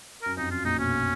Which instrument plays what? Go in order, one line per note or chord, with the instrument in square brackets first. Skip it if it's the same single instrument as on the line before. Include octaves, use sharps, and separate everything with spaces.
[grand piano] F#2 [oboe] A#4
[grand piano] F2 [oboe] D#4
[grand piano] F#2 [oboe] F4
[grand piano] A#1 A#2 [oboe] D#4
[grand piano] B1 B2 [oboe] C#4